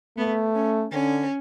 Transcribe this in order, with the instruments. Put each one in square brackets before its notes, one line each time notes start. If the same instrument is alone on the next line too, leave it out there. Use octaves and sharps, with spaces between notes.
[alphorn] A3 [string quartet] B3
[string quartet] C#4
[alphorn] D3 [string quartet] C#4